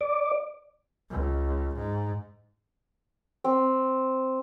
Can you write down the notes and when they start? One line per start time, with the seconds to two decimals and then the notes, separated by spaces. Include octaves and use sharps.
0.01 D5
1.11 C#2
1.77 G#2
3.44 C4